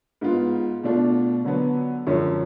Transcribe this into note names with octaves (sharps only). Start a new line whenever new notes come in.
G#2 G#3 B3 F4
B2 A3 D4 F4
D3 F#3 B3
F#2 D3 F3 G#3 C#4